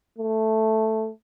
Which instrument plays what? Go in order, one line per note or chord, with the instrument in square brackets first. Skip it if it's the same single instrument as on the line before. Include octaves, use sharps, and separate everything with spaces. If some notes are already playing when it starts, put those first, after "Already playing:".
[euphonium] A3